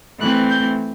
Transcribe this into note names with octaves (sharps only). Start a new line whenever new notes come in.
E3 A3 C4 F#6
G6